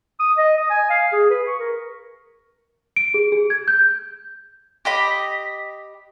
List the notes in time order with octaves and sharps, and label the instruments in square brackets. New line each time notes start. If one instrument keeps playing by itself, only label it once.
[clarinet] D#6
D#5
D#6
G#5
F5
G#4
B4
C#6
A#4
[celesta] D7
G#4
G#4
G#6
G6
[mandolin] G4 D#5 B5